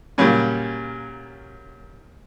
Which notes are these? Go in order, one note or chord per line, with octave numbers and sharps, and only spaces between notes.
A#2 C#3 F#3 G3 C#4